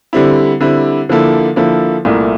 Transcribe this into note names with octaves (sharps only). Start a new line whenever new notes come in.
D3 G3 C4 E4
D3 G3 C4 E4
D3 F3 A#3 E4 A4
D3 F3 A#3 E4 A4
C2 A#2 A3 E4 A#4